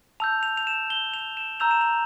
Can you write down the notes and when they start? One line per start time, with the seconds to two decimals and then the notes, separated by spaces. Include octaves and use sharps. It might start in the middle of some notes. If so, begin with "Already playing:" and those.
0.20 A5 E6 G6 F7
0.43 F7
0.57 F7
0.67 E7
0.90 G7
1.14 F7
1.37 E7
1.60 A#5 E6 G6 F7
1.71 E7
1.81 F7